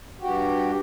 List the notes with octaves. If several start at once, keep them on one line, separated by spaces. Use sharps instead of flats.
G2 F#4 G4